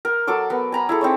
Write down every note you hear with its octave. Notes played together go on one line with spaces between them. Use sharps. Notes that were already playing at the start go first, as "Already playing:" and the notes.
A#4
F#3 A4 C6 D6
B3 A#4
G#5 A#5 B5
E4 G#4 A4
C4 D#4 C#5